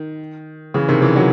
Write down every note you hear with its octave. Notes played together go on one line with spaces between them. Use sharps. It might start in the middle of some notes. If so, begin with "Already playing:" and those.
Already playing: D#3
C#3 E3
C3 D#3
C#3 E3
D#3 F#3